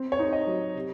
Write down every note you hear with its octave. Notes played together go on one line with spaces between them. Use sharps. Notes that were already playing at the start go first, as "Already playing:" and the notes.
Already playing: C4
C#5
D#4
D#5
F#3
C3